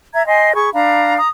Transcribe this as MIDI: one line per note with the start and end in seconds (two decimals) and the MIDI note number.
0.13 0.25 76
0.13 0.25 82
0.13 0.25 92
0.26 0.51 75
0.26 0.51 79
0.26 0.51 80
0.26 0.51 84
0.54 0.70 68
0.54 0.70 83
0.54 0.70 85
0.74 1.17 62
0.74 1.17 77
0.74 1.17 82
0.74 1.17 83
1.17 1.28 82
1.17 1.28 87